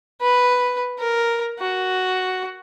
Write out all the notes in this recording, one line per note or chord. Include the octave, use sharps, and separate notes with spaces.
B4
A#4
F#4